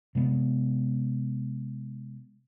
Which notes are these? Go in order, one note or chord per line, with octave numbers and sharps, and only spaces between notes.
C3 G#3 B3